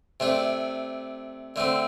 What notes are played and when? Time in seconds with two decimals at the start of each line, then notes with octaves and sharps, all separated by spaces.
0.20 C3 A3 D4
1.56 D3 A3 C4